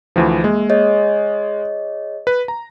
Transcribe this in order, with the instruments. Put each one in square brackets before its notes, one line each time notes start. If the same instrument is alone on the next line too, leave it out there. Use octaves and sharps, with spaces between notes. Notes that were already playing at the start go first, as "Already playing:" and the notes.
[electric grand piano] D2 E3 F3
[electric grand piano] G#3 [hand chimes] A#3
[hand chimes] G#4 C#5 D#5
[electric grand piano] B4
A#5